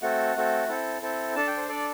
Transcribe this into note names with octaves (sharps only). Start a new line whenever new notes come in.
A3 C4 F#4 A4 F#5
A3 C4 F#4 A4
C4 E4 A4
C4 E4 A4
D4 A4 A5
G5
C5
D4 A4 D5